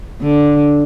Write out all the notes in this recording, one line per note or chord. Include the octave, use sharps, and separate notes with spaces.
D3